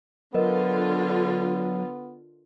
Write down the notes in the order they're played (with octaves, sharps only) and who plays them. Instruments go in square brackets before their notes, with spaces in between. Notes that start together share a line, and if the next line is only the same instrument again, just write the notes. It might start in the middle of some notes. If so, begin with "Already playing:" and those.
[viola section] D3 F4 [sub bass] F#3 [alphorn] B3 [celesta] A#4 B4 D#5